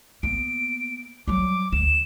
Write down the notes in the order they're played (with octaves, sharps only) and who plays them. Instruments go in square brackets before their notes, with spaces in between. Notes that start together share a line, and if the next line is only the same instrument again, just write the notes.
[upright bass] A#3 B3 [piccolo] D7
[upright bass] F#3 G3 [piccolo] D6
[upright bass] D2 [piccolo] E7